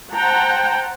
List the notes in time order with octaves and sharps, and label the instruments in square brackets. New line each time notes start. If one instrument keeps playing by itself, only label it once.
[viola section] C5 F#5 G5 A5 A#5